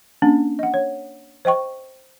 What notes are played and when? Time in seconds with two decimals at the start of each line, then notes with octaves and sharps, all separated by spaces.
0.22 A#3 C#4 D4
0.59 D#5 F#5
0.74 C#5
1.45 C5 D#5 G5 C#6